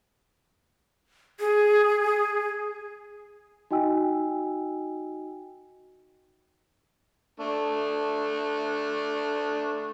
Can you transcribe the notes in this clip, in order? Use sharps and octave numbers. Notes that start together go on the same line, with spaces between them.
G#4
D#4 F#4 D#5 G5 G#5 E6
A3 D4